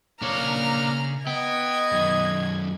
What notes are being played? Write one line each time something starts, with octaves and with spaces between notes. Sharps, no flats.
C#3 A#3 D4 C#5 A#5 F6
B3 D#5 G5 G#6
F#2 D#3